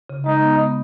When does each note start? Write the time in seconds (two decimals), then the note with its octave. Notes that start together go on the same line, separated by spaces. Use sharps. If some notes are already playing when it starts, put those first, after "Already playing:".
0.10 C#3
0.26 G#3 D#4
0.43 B3
0.59 B3